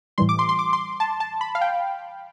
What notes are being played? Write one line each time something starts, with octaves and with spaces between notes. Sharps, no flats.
A2 E3 G3 C6
D6
C6
C6
D6
C6
A5
A5
B5
F5
G5